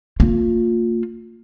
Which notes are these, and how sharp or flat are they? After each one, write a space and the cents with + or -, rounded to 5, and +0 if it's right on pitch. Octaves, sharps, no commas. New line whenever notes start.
A#3 -35 F4 +20